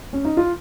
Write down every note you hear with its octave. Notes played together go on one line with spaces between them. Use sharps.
C#4
D#4
F4